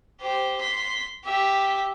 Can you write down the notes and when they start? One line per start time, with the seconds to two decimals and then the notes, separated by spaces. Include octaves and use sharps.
0.21 G4 C5
0.61 C6 B6
1.25 G4 E5